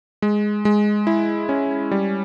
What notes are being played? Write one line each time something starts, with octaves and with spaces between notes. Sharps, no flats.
G#3
G#3
E4
C#4
G3